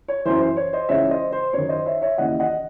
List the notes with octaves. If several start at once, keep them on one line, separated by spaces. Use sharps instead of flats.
C#5
F#2 E3 C5
C5
C#5
C5 D#5
C#2 C#3 E3 C#5 E5
C5 D#5
C5
F#2 D#3 C#5
C5 D#5
C#5 E5
C#5 E5
D#2 C#3 E3 D#5 F#5
D#5 F#5